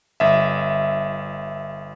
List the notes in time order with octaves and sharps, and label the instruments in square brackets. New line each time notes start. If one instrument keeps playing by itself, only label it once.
[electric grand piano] G1 E5